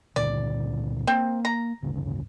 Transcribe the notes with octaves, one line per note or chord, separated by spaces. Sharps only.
C#2 A#2 D3 D5
A#3 C4
A#5
D1 G1 C#3